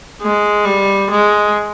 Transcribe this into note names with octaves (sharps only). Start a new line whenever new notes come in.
G#3
G3
G#3